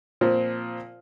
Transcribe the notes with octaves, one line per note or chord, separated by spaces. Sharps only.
A#2 F3 C4